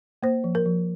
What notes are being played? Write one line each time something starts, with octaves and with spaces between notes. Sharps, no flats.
A#3 C5
F3
A#4
F3